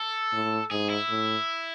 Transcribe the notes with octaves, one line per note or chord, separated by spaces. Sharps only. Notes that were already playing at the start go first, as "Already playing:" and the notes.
Already playing: A4
A2
G#2 G#4
E4
A2